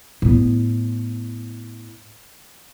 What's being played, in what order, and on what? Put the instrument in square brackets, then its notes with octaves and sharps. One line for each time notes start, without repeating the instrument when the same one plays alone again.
[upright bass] A2 B3